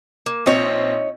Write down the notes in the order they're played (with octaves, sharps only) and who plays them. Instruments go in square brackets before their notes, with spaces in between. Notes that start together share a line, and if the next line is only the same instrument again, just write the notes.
[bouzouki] A#3
[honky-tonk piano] A#1 C4 [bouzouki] D#4 C#5